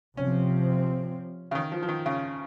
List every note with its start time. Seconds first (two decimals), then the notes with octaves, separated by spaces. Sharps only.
0.17 C3 F3 C4 C#4
1.51 C#3
1.55 D#3
1.72 F3
1.83 F3
1.88 D#3
2.06 C#3